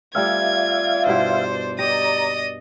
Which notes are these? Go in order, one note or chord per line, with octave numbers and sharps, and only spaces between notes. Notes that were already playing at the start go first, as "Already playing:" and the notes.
G3 A3 C4 F4 D5 E5 F5 G#6
G2 B2 E4 C5
G4 D5 D#5 A#5 D#6